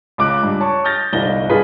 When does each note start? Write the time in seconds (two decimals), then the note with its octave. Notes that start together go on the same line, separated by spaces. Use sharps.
0.18 C#2 D6 F#6
0.43 G2
0.60 C#5 A5 C#6
0.84 D#6 F6 G6 A6 A#6
1.13 G1 C2 D#4 A#6 G7
1.49 G2 F4 G#4 B4 B6